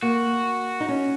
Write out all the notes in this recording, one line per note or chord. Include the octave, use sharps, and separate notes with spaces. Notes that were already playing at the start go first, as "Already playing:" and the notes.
A#3 F#4
D#4
C#4